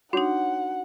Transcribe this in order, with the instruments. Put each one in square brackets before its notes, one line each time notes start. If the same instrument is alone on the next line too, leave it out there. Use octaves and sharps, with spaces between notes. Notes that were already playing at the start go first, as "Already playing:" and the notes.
[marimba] D4 D#4 [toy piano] F#4 C#5 [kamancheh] F#5